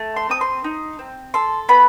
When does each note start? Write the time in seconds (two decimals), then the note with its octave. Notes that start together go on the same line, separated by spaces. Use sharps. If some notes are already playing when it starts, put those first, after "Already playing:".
Already playing: A3
0.16 C6
0.29 C4 D#6
0.41 C6
0.64 D#4
0.99 C4
1.34 A4 C6
1.69 B3 B5